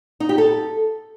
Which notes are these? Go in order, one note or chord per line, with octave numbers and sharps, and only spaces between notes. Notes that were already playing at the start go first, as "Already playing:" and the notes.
D#4
G4
A4